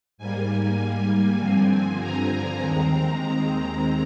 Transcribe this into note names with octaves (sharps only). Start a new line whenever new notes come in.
G#2 G3 A#3 G#5
G2 D3 F3 C4
A#5
D#2 D#3 G#3 C4
A#5